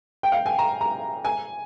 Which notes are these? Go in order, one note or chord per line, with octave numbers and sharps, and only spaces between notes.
G5
F5
G#5
A#5
A#5
G#5